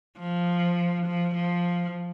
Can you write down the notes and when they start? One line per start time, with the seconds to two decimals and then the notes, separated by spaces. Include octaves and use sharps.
0.19 F3
1.06 F3
1.35 F3